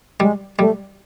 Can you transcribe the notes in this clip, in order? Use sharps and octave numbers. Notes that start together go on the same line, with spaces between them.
G3 G#3
G3 A3